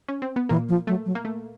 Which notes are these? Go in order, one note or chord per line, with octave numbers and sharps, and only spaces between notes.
C#4
C4
B3
A#2 E3 A#3
F3
F#3 A3
F#3
A#3
A3